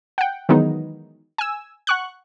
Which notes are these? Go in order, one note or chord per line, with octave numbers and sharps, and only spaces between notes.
F#5 G5
D#3 E3 F#3 G#3 B3 D#4
G#5 E6
F#5 C#6 F#6